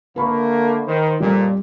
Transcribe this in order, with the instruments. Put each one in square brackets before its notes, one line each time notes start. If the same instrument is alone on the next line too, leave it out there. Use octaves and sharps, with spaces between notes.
[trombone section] D3 A3 A#3 [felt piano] B4 B5 C#6
[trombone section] D#3 C5
[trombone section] F2 A#2 [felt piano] G3